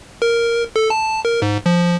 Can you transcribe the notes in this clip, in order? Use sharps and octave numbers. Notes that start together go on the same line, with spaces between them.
A#4
A4
A5
A#4
G#2
F3